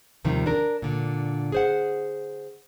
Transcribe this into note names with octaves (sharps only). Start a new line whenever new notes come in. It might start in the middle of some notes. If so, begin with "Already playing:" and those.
D#2 C3 D#3 F3 G3
D4 A#4
A#2 D3
G#4 C5 F#5